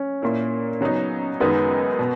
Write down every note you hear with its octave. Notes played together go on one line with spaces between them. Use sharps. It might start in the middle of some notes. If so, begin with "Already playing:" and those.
Already playing: C#4
A#2 A#3 E4
C#3 F#3 B3 D#4
F#2 D#3 G#3 B3 D#4
B2